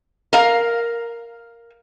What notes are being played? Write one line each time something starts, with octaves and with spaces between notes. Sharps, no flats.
A#4 F5